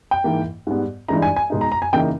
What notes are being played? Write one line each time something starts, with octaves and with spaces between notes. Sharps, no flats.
G5
G#2 E3 A#3
G#2 G3 B3
G2 E3 G#3 D#4 A#5
G#5
G#5
B2 G#3 D#4
A#5
A#5
G#5
C#3 E3 A#3 D#4 G5